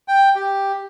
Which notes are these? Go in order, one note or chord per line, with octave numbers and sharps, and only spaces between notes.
G5
G4